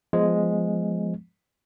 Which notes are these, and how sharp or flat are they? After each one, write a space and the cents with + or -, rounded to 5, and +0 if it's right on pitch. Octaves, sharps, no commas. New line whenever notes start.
F3 +0 G#3 +0 B3 +5